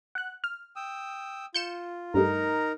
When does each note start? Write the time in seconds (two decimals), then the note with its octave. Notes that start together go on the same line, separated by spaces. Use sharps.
0.15 F#5 F#6
0.44 F6
0.76 G5 D#6 E6
1.54 F4 G6 C#7 E7
2.14 G2 G3 A3 D#4 A#4 A#5